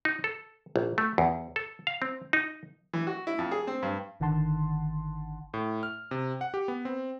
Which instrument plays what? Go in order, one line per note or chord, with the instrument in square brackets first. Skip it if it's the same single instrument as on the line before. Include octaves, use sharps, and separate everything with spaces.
[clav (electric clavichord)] D#4
A4
A#1
A3
E2
A4
F5
C4
D#4
[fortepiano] E3
F#4
E4
F2
G#4
C4
G2
[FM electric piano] G#1 D3 D#3 F#5 A5 C6
[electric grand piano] A2
F6
C3
F#5
G4
B3
C4